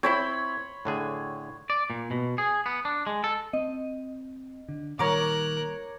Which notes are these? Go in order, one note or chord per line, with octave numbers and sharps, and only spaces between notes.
C4 E4 C#5 B5 C6
A2 D3 G#4
D5
A#2
B2
G#4
B3
D4
G#3
A4
C4 D#5
D3
A#2 D#3 G3 A#4 C#5 A#5 D6 F#6